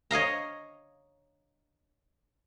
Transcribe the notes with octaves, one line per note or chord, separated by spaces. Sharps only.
C#5 D#5 F5 A#5